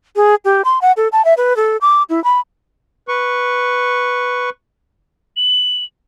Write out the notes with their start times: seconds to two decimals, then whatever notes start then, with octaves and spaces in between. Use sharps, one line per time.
0.16 G#4
0.45 G4
0.65 C6
0.82 F#5
0.97 A4
1.12 A5
1.25 E5
1.37 B4
1.56 A4
1.81 D6
2.10 E4
2.24 B5
3.08 B4 C#6
5.37 F#7